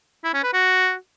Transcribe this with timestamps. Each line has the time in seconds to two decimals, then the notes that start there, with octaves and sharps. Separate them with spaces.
0.24 E4
0.34 C#4
0.43 B4
0.53 F#4